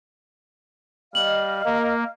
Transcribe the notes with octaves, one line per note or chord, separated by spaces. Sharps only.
G3 D#5 F5 F6 F#7
A#3 A#4